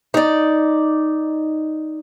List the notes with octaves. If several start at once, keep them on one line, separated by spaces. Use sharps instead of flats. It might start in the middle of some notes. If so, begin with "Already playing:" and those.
D#4 D5